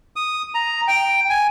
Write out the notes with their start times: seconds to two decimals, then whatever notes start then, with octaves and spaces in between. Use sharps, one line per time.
0.16 D#6
0.54 A#5
0.88 G5
1.30 G#5